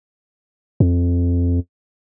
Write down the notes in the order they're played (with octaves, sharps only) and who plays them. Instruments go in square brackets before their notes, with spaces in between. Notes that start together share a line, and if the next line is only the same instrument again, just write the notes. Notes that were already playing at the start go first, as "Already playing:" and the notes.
[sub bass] F2